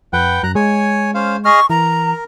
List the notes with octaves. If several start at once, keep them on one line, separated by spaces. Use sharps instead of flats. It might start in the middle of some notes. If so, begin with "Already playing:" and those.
F2 B4 F#5 G5
F#2 A#5 F#6
G#3 C#5 G#5
C#4 C5 F5
G#4 D#5 C#6 F6
E3 A#4 A#5